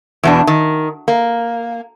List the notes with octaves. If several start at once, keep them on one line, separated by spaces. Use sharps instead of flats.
E2 B2 D4
D#3
A#3